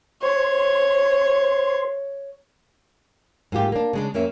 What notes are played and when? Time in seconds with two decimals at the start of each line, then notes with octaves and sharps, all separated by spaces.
0.22 C5 C#5
3.52 G#2 A#3 F4 G4
3.72 A#3 D4
3.93 C#3 G#3 D4
4.14 F2 A#3 C#4 A#4 E5